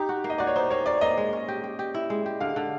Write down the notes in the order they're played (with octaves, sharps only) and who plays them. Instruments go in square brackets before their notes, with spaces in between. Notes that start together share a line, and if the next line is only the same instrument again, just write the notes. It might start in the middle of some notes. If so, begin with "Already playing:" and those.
Already playing: [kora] D#4 [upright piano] G4
[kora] F#4
A#3
[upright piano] D#5
[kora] F#4 [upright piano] D5
[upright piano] C#5
[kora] D#4 [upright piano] C5
[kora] A#3 [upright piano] C#5
[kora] A#3 [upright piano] D5
[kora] A#3 [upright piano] D#5
[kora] G#3
C#4
G4
G4
G4
E4
G#3
G4
[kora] D3 [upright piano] F5
[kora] D3